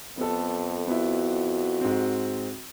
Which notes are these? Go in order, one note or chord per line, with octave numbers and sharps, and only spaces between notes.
F2 B3 A4
B3 E4 F#4
G#2 C4